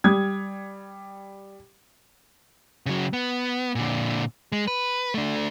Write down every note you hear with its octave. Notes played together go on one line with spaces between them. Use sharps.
G3 D#6 G#6
C#3 F#3
B3
A#2 D3
G#3
B4
A3 D4